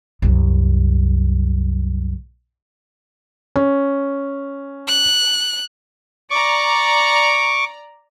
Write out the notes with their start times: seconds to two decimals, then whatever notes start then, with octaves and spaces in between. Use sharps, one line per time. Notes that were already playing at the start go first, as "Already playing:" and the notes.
0.22 C2 F#2
3.56 C#4
4.88 F#6
6.30 D5 A#5 C#6 D6